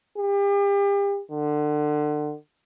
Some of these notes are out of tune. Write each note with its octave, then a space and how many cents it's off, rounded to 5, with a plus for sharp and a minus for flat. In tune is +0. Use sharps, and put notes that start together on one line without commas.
G4 +40
D3 +30